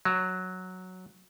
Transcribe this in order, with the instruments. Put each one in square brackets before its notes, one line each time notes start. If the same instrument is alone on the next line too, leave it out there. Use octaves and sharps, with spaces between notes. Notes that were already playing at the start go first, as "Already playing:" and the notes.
[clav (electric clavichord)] F#3